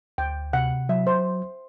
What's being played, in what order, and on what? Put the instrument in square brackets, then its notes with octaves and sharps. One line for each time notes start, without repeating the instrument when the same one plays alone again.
[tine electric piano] D2 [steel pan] G5
[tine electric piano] C3 [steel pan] F#5
[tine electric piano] F#3 [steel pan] E5
[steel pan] C5